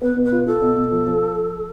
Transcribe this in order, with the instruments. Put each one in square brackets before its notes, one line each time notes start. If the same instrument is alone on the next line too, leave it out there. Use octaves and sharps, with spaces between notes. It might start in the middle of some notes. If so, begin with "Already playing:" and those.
[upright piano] B3 [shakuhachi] B4
[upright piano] B2
[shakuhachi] B4
[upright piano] F4
[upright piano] F4 [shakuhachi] A4
[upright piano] B2
B2
F3
F3